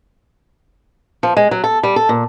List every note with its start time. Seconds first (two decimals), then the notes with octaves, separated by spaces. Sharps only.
1.23 F3
1.37 G#3
1.51 F#3
1.64 A4
1.83 G3
1.96 A4
2.09 A#2